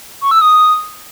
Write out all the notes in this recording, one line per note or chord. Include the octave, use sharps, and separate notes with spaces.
C#6
E6
D#6